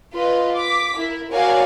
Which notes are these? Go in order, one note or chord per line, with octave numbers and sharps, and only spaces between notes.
F4 B4 D#5
D6 B6
E4 A#4
F#4 A#4 C#5 D5 F5 G#5